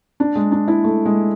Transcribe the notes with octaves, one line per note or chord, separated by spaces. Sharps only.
D4
G#3
D4
E4
A3
G#3